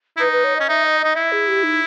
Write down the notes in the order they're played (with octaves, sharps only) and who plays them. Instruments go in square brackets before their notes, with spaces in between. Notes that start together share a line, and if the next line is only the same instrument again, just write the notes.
[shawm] E4
[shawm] D#4 [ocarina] B4
[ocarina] B4
C#5
[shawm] C#4 [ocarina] D#5
[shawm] D#4 [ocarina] E5
[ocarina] D#5
[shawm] D#4 [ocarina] D#5
[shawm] E4 [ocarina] E5
[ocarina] G#4
G4
D#4